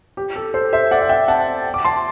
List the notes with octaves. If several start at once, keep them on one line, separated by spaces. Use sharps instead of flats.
G4
A4
A4 C5
C5 E5
D5 F#5
F#5
E5 G5
F#5 A5
D6
A5 C6